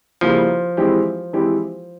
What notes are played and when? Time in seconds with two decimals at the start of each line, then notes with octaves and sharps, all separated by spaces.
0.21 C#3 F3 G3 A#3 E4
0.77 E3 G#3 C4 E4 G4
1.33 E3 G#3 C4 E4 G4